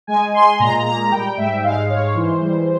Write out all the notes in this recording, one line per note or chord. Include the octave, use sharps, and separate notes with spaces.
G#3 G#5
G#3 C6
A#2 A#5
A#3 A#5
G3 G5
G#2 E5
G#3 F5
G#3 C#5
E3 C5
G3